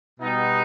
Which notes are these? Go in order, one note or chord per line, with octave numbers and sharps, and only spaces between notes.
B2 G3 D#4